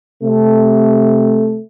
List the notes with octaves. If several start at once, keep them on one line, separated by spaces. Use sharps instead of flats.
C3 A3